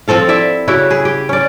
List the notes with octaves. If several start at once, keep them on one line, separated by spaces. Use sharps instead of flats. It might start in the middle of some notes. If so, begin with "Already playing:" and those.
F3 C4 A4 F5
E4 D5 E5
C#3 E4 F#4 G4
G#4
G4
C#4 D5